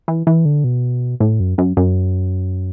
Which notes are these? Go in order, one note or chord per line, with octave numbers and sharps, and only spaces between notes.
E3
E3
D3
B2
A2
F#2
F#2
F#2